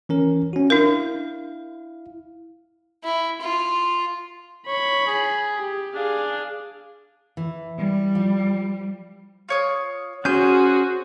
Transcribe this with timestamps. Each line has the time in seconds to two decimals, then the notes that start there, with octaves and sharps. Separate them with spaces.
0.09 E3 C#4 A#4
0.53 C#4 F#4
0.70 D4 E4 A#4 F5
3.04 E4
3.41 F4
4.67 C#5 B5
5.06 G#4
5.57 G4
5.95 D4 G#4 F5
7.37 E3
7.78 G3
8.15 F3
9.49 F4 C#5 D#6
10.25 C#4 F#4 G#4 C5 C6 G6